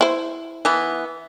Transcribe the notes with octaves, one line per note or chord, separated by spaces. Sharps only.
E4 C5
E3 B3